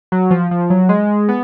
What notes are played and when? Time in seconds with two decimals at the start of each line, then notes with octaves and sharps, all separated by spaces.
0.12 F#3
0.31 F3
0.51 F3
0.70 F#3
0.89 G#3
1.28 B3